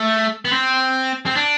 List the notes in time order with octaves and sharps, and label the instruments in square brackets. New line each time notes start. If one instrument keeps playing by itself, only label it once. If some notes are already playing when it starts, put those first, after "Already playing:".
Already playing: [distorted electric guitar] A3
B3
C4
C4
D4